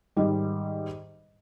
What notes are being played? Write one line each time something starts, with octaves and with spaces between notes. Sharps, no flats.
G#2 D#3 G3